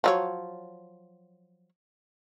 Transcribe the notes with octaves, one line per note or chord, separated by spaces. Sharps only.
F3 F#3 C#5